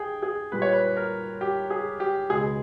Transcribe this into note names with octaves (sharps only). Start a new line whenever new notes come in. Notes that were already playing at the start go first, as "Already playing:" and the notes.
Already playing: G#4 G5
G#4
A#2 G3 B4
C#5
B4
A#4
G4
G#4
G4
C#2 B2 G#3 G#4